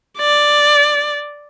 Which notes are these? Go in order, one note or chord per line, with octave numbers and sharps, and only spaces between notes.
D5